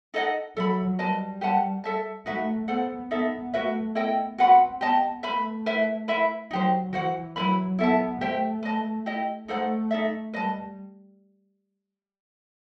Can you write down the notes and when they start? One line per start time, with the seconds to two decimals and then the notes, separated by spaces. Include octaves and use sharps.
0.14 D#4 A4 D#5 F#5
0.56 F#3 A4 E5 B5
0.99 G3 B4 D#5 A5
1.41 G4 B4 F#5 A5
1.84 A4 E5 A5
2.26 A3 D#4 F#4 B4 E5
2.68 B3 A4 C5 F#5
3.11 B3 D#4 A4 E5
3.54 A3 F#4 B4 E5
3.95 B3 E4 A4 D#5 G5
4.38 C4 F#4 B4 F#5 B5
4.81 B3 G4 D#5 A5
5.23 A3 B4 E5 B5
5.66 E4 B4 E5
6.08 E4 B4 E5 B5
6.51 F#3 D#4 G4 C5
6.93 E3 F#4 C5 F#5
7.36 F#3 E4 B4 E5 B5
7.79 B3 E4 A4 E5 A5
8.20 A3 G4 C5 E5 G5
8.63 B4 D#5 A5
9.06 E4 G4 D#5
9.48 A3 D#4 A4 C5 F#5
9.91 D#4 A4 E5
10.34 G3 B4 D#5 A5